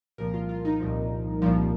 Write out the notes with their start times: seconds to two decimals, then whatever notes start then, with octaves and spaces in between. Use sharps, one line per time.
0.18 C2 A#2 F3 A#4
0.34 F4
0.49 F4
0.65 D#4
0.80 C2 A#2 F3
1.42 C2 A#2 F3